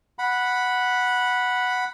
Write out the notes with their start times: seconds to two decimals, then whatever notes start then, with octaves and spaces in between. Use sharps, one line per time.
0.19 F#5 B5